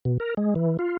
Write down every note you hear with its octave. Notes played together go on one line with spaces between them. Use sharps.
B2
A#4
G#3
E3
F4